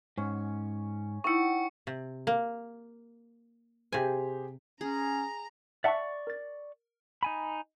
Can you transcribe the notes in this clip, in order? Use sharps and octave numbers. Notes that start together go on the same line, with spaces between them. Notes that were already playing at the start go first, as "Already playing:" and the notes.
G#2 C#4
D#4 E4 F#5 G5 C#6 C#7
C3
A#3
C3 G4 G#4 C5 G#5
C#4 G#4 A#5
D5 E5 F#5 A5 C#6
A#4 A6
D#4 G#5 B5